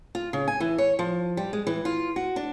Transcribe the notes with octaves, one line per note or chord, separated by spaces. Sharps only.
F4
C#3
G#5
E3
C#5
F3
G3
G#3
E3
F4
F#4
D4